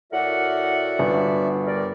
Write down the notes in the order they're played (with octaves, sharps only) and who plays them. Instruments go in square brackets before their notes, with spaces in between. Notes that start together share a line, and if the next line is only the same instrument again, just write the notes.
[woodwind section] A2 A#4 F#5 [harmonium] F#4 D5 E5
[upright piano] G1
[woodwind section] G3 A#4 D5